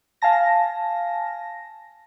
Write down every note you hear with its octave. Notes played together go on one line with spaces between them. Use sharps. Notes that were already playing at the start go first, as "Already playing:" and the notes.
F5 G#5 A5 A#6